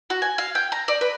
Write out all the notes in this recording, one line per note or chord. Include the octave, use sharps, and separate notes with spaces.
F#4
G#5
F5
G5
A#5
D5
B4